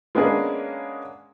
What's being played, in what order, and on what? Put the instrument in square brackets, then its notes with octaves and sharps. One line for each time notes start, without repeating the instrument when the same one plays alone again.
[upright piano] G#3 A#3 B3 C#4 D4 G#4